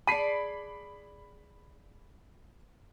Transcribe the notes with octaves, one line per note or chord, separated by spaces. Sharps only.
G#4 D5 A5 B5 B6 C7